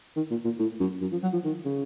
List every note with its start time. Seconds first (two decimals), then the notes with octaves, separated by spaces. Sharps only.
0.16 D#3
0.31 A#2
0.44 A#2
0.59 A2
0.80 F#2
1.01 F#2
1.12 F3
1.23 F#3
1.33 F3
1.45 D#3
1.65 C#3